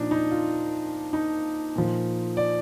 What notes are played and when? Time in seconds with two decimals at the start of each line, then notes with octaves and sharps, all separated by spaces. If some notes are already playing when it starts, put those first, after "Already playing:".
Already playing: A#2 F3 D4 D#4
0.11 D#4
0.31 F4
1.13 D#4
1.76 A#2 F3
2.37 D5